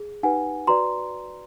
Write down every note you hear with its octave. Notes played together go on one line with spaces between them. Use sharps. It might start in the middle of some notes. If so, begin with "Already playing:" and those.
Already playing: G#4
D#4 G4 B4 F#5 G#5
F#4 B4 D5 A#5 C6